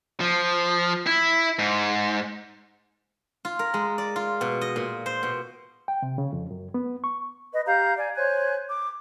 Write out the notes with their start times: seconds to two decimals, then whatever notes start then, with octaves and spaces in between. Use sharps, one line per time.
0.20 F3
1.07 E4
1.59 G#2
3.45 F4
3.59 A#4
3.74 G#3
3.98 D5
4.16 F4
4.41 B2
4.61 D#5
4.76 A#2
5.06 C5
5.23 B2
5.88 G5
6.02 C3
6.18 C#3
6.33 F2
6.51 F#2
6.74 B3
7.04 C#6
7.53 B4 D#5
7.66 G4 F5 A#5 G6
7.97 D5 G#5
8.16 C5 C#5 G#5 F#6
8.69 D6